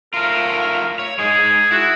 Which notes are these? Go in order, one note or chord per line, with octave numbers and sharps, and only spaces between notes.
A3 F4 A#4
C#5
G#3 D#4 G#4
E4 F#4